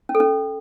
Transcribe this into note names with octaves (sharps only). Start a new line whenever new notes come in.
C#4
A4
C#4